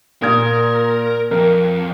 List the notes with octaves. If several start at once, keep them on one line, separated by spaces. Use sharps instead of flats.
A#2 A#4 D#6 G#6
F2 A#4